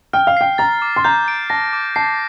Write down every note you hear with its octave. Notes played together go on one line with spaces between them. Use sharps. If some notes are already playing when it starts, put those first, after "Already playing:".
G5 F6
F5
G5 C7
A#5 A6
D6
C6
A#5 G6
D7
A5 A#6
D6
A5 C7